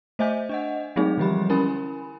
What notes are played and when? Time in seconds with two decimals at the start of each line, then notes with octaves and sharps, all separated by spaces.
0.19 A3 C5 D#5 E5 G#5 G6
0.49 D4 D#5 F#5
0.96 F#3 G#3 A3 C4 D#4 G#4
1.17 D3 E3 F3 G3 G4 B5
1.49 C#4 E4 A#4 G#5 B5